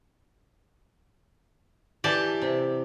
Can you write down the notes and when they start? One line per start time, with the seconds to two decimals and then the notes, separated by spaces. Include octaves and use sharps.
2.04 E3 G4 D5 G#5 A5
2.42 C3